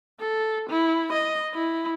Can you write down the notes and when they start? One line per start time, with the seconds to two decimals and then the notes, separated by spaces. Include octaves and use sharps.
0.19 A4
0.69 E4
1.12 D#5
1.54 E4